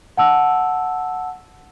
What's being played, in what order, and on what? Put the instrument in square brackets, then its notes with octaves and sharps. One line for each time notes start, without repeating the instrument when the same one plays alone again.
[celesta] F#5 A5 E6